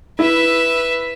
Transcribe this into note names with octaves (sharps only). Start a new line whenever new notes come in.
E4 B4 E5